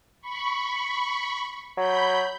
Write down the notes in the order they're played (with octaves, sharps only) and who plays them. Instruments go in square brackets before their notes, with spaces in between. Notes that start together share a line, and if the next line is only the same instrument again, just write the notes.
[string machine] B5 C#6
[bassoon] F#3 [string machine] B5 G6